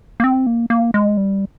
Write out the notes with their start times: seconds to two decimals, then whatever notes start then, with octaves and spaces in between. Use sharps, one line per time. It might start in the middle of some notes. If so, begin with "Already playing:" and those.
0.20 A#3
0.24 C4
0.47 A#3
0.70 A#3
0.94 G#3
1.17 G3